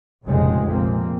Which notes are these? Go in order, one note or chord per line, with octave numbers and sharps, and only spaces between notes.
F1 A#1 C#3 G#3 C4
A#1 A#2 A#3 C4